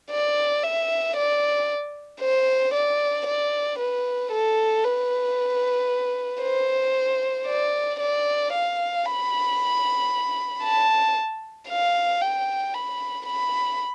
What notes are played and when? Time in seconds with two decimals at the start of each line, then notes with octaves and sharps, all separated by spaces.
0.11 D5
0.63 E5
1.16 D5
2.21 C5
2.74 D5
3.27 D5
3.79 B4
4.32 A4
4.84 B4
6.42 C5
7.47 D5
8.00 D5
8.53 F5
9.05 B5
10.63 A5
11.69 F5
12.21 G5
12.74 B5
13.26 B5